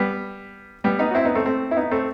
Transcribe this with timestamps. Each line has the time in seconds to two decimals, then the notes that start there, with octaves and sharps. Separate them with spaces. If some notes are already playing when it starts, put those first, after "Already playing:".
Already playing: G3 B3
0.84 G3 B3
0.99 B3 D#4
1.11 F#4
1.15 C4 E4
1.25 B3 D#4
1.35 A3 C4
1.46 A3 C4
1.71 E4
1.76 B3 D#4
1.91 A3 C4